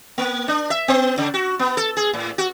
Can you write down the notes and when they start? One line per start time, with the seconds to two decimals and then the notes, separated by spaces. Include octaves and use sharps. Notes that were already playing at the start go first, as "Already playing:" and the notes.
0.18 A#3
0.48 D4
0.70 E5
0.88 B3
1.18 C#3
1.34 F#4
1.59 B3
1.77 A4
1.97 G#4
2.13 A2
2.38 F#4